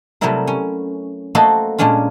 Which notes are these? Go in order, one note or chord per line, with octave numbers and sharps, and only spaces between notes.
C3 F#3 G3 A3 E4 A#4
C#4
A3 A#3 F#4 A4 C5 D#5
A#2 G#3 C#4 D4 F4